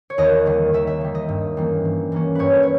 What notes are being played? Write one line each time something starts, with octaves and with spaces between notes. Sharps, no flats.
C#5
D#2 D#5
D#3 G3
D#2 E5
E5
D#3 G3
D#5
G2
E3 G3 A#3 C#4
G2
E3 G3 A#3 C#4
G2 B4 C#5
C#5